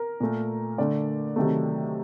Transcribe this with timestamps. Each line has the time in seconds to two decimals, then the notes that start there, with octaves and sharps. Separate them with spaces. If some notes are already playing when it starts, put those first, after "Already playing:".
Already playing: A#4
0.20 A#2 A3
0.78 D3 A3 D5
1.36 C3 D#3 F#3 A3